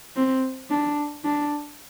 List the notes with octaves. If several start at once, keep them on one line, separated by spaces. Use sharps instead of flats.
C4
D4
D4